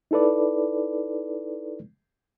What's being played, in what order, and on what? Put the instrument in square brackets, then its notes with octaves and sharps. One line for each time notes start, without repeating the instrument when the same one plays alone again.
[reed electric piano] D#4 E4 A4 B4 D5